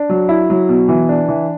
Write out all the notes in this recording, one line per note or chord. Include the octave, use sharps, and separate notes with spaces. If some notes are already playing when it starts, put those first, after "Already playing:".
Already playing: D4
F#3
E4
F#3
B2
E3
D4
E3